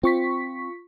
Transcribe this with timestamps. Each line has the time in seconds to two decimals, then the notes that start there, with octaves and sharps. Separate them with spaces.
0.03 C4 F4 C#6 B6